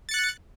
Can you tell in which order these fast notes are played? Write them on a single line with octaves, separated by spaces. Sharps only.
A6 C#7 F#6